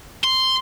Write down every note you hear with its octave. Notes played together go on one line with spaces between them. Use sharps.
C6